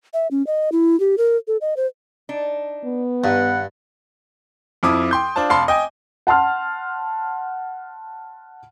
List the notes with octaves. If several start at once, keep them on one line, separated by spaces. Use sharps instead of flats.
E5
C#4
D#5
E4
G4
A#4
A4
D#5
C5
D4 D#4
B3
G2 D#3 B4 F#5
F2 F3 E4 D6 D#6
G5 C6 G6
D4 F4 C5 A5
F1 F5 A5 B5 C6
D#5 G5 G#5
F#5 A5 C6 F6